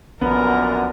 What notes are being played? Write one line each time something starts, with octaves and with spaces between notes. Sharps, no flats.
A#1 F#2 A#2 D3 B3 A#4